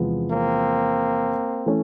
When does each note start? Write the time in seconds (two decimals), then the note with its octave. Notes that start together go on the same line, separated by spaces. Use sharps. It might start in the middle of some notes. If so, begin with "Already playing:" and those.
Already playing: E2 C3 F3 G#3 B3
0.31 A#3 C4
1.66 E3 A3 C#4